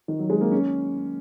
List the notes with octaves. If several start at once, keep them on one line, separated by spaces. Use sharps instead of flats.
D#3
F#3
G#3
A#3
C#4